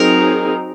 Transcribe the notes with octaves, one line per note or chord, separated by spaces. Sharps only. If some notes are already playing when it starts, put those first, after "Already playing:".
Already playing: F#3 C4 D#4 G#4 A#4